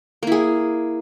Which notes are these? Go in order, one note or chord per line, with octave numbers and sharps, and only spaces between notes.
A#3 E4 G#4